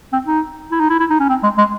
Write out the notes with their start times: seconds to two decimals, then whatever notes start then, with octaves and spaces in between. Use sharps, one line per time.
0.13 C4
0.27 D#4
0.71 E4
0.80 D#4
0.90 E4
1.00 E4
1.10 D#4
1.20 C#4
1.29 C4
1.43 G#3
1.58 G#3